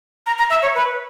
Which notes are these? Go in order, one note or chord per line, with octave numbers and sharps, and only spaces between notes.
A#5
A#5
E5
C#5
B4